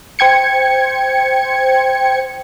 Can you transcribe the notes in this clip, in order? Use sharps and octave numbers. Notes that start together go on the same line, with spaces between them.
C5 G5 G#6 C#7